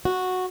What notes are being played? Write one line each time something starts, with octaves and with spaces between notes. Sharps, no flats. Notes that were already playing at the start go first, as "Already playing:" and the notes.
F#4